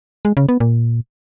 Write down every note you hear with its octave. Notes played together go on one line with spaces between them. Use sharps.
G#3
C#3
B3
A#2